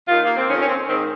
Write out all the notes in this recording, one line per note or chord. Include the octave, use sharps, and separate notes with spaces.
D#2 D#3 F4
A#3
C4
F2 D#3 C#4
C#4
C4
G#2 D#3 C4